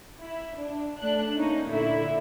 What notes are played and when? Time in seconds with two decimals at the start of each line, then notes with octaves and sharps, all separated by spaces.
0.21 E4
0.57 D4
0.99 A3 D4 F#6
1.36 A#3 C#4 D#4
1.70 A#2 D3 E4